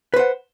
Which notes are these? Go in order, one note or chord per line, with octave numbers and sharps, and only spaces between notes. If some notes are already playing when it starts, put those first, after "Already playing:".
B4 C5 F#5